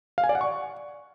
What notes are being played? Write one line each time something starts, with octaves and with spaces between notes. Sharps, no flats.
F5
G#5
D5
F#5
C#6